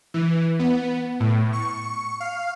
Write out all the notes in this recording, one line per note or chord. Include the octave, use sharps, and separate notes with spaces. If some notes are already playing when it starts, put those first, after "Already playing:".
E3
B3
A2
C#6
F5